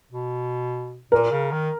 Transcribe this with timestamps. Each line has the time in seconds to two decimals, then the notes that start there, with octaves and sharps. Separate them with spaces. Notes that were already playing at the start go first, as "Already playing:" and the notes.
0.12 B2
1.11 A#2 A#4
1.31 C#3
1.52 D#3